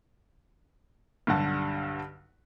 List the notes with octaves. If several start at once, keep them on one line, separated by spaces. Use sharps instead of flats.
B1 G2 D3 G3 F#5 A5